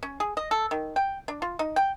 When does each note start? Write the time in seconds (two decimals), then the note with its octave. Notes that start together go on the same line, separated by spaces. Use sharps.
0.03 C#4
0.20 G#4
0.37 D#5
0.51 A4
0.71 D#3
0.96 G5
1.28 D4
1.42 F4
1.59 D#4
1.76 G5